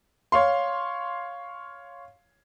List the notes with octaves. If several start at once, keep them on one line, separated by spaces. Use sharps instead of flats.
C#5 F5 C6